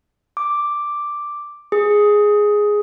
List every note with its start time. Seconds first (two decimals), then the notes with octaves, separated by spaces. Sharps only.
0.37 D6
1.72 G#4